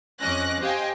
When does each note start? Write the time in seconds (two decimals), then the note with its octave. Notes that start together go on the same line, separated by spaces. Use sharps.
0.21 F2 C#4 D#5 D6 F#6 A#6
0.61 G4 C5 D#5 F5 G5 G#5